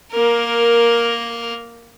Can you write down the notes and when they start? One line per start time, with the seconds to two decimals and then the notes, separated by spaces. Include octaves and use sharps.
0.11 A#3 A#4